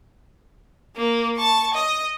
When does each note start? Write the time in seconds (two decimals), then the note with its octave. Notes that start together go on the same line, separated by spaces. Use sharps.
0.96 A#3
1.37 A5 C#6
1.74 D#5